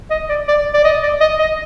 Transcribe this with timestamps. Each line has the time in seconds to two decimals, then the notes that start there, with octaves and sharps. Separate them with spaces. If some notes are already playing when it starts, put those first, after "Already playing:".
0.11 D#5
0.29 D5
0.48 D5
0.74 D5
0.84 D#5
1.03 D5
1.21 D#5
1.39 D#5